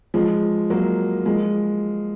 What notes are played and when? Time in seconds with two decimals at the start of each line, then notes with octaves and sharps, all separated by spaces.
0.14 F3 G#3
0.70 F#3 A#3
1.26 F3 G#3